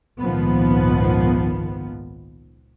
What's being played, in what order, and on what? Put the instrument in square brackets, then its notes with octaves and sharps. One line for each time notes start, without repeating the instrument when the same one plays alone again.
[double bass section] G#1 C#2 A#2 D#3 F3 B3